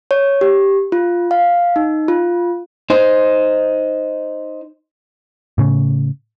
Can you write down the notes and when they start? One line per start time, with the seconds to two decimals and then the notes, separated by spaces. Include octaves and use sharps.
0.11 C#5
0.41 G4
0.92 F4
1.31 F5
1.76 D#4
2.08 F4
2.90 D#4 C5
5.58 A2 C#3